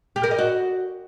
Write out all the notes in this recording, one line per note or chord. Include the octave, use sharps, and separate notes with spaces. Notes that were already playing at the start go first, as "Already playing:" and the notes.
G4
A#4
D#5
F#4